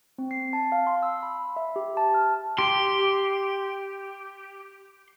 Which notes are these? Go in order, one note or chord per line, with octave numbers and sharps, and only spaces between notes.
C4
C7
A5
F5
C6
E6
B5
E5
G4
A5
F6
G4 C6